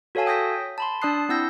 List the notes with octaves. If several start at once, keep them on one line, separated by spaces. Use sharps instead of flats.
F#4 A4 C#5 F5 G#5 A5
G5 D#6 G6 A#6 B6
A5 B5 C6
D4 D5 A5 D#6 F#6 C7
C4 E4 F#5 E6 G6 A#6